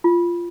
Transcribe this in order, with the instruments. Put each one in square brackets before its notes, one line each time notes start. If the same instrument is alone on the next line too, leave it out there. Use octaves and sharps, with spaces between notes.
[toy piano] F4